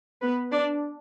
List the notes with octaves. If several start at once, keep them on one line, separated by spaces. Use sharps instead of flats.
B3 B4
D4 D5